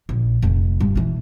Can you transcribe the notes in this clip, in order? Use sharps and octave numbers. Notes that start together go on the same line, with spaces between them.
A#1
F1
G2
B2 E3